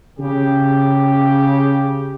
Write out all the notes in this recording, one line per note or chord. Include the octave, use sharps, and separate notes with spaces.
C#3 G4